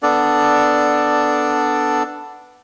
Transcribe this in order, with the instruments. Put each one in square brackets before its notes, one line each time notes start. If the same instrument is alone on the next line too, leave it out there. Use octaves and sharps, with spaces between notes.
[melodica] B3 D4 A4 D5